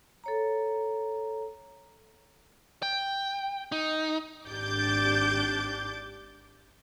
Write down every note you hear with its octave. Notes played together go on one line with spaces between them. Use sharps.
A4 C#5 A#5
G5
D#4
G#1 D4 G4 D6 G6 A6